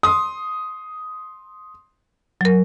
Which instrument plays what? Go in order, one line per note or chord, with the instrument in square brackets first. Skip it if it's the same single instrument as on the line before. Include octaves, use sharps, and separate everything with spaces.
[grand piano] C6 D#6
[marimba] F#3 A#4